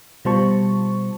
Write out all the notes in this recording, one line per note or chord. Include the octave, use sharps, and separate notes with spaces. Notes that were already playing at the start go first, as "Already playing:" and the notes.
B2 G3 F4 C5 A5 C#6